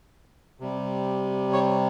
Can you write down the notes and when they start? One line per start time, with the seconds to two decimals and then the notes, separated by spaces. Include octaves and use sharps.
0.60 C3 G3
1.53 C#5